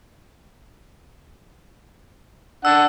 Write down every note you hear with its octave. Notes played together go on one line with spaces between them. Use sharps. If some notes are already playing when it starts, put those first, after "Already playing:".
D4 F#5 E6